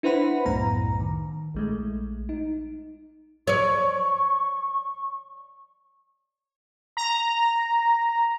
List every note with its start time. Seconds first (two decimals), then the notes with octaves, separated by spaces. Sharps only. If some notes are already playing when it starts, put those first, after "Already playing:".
0.03 D4 E4 B4 C5 F#5 B5
0.46 C2 F#2 A2 B3 A#5
1.00 D#3
1.54 A#1 G#3 A3
2.29 D#4
3.47 C#5 D5 C#6
6.97 A#5